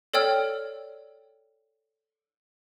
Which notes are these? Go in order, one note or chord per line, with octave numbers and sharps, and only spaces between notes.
A4 C#5 D5 G5 E6 F6